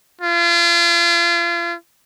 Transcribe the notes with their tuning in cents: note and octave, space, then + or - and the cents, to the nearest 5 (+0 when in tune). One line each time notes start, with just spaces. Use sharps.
F4 -35